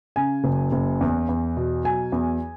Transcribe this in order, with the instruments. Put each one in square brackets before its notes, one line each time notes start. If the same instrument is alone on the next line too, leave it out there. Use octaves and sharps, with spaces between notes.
[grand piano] C#3 G#5
F#1
F#1
E2
E2
B2
F#3 G#5
E2